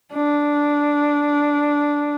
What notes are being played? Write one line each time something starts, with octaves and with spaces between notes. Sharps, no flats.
D4